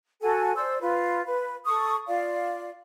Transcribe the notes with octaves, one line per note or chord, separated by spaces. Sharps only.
F#4 A4 G#5
C5 D5 E6
F4 B4
B4
A4 C#6 D#6
F4 D5 F5